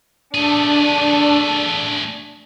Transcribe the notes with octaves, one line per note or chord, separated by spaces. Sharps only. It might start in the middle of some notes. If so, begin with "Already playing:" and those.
A3 D4 G#4